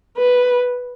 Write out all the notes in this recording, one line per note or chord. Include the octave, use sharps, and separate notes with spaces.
B4